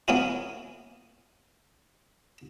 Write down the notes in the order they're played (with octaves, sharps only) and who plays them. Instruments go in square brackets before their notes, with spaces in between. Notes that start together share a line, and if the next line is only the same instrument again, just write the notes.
[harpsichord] A#3 B3 C#4 E4 F#4